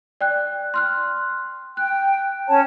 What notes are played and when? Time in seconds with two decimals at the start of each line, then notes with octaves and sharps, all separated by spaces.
0.21 D5 G5 F#6
0.74 C6 F6 F#6
1.77 G5 F#6
2.48 C#4 C#5 A5